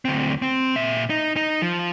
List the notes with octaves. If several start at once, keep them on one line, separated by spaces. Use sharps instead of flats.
D2 C4
C4
A#2 E5
D#4
D#4
F3